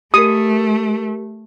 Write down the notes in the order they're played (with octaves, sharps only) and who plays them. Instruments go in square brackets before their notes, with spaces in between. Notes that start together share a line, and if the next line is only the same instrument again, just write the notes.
[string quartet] A3 [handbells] G4 A#4 [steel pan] D#6